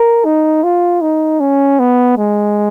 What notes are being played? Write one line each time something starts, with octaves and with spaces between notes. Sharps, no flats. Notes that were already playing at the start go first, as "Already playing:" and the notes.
Already playing: A#4
D#4
F4
D#4
C#4
B3
G#3